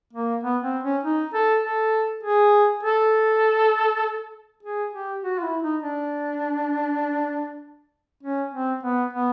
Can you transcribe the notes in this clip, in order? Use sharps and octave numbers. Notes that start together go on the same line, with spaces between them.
A#3
B3
C4
C#4
D#4
A4
A4
G#4
A4
G#4
G4
F#4
F4
E4
D#4
D4
C#4
C4
B3
B3